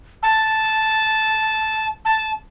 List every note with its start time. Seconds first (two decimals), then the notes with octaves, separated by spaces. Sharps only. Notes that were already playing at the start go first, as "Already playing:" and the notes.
0.23 A5
2.05 A5